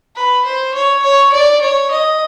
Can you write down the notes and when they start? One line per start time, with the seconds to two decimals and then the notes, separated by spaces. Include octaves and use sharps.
0.16 B4
0.45 C5
0.74 C#5
1.03 C#5
1.32 D5
1.61 C#5
1.91 D#5